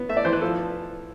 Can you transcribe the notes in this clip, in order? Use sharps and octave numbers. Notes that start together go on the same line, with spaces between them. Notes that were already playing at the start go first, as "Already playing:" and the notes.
Already playing: B3
A3 E5
D5
E3 C5
B4
F3 A4